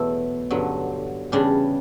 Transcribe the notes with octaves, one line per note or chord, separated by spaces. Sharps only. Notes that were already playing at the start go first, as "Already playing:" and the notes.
Already playing: E2 B2 F#3 A3 E4
G2 D3 F#3
E2 C#3 G3 D4